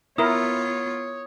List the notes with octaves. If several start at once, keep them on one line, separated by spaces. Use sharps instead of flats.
B3 E4 F4 A#4 C#5 D#6